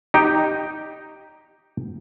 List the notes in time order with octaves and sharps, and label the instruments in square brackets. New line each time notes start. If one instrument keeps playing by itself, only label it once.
[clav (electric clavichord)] D#4 G4